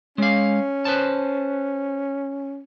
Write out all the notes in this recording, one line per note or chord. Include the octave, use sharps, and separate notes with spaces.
G#3 C#4 F5
B4 C5 A5